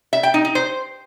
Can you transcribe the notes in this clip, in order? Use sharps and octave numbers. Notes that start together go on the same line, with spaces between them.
E5
G5
D#4
D#4
C5